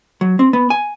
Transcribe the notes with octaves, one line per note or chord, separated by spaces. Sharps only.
F#3
C4
B3
G#5